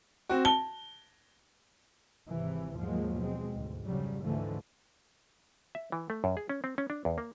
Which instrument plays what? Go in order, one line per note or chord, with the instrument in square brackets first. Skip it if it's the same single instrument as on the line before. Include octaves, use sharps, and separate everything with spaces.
[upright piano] C4 F#4
[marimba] A5 [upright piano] G7
[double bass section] G#1 C3 E3
D#2 G#2 F3 F#3 G#3 A#3
B2 G#3 C4
D2 G#2
F2 C#3 F#3 G3
D2 G#2 D3 E3 F3 A3
[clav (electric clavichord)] E5
E3
A3
F#2
G#4
C#4
C4
C#4
D4
E2
A#3